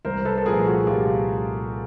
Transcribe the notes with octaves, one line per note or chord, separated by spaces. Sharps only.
C2 A#4 C5
A4 B4
A4
A#2 F3 A3 G#4 A#4
F#4 G#4
C2 F4 G4